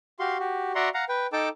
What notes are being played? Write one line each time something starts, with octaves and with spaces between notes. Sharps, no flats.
F#4 G4 F5 C6
F#4 G4
F#4 D5 E5 F#5 A#5 C6
F5 F#5 A#5
B4 G5
D#4 A4 G5 A5 D6